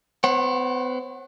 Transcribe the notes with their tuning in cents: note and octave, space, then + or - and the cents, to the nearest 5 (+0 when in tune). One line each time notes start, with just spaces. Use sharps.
B3 +45 C#5 -45 F#5 +0